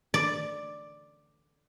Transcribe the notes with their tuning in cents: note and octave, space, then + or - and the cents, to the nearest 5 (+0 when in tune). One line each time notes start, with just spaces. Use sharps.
D5 +5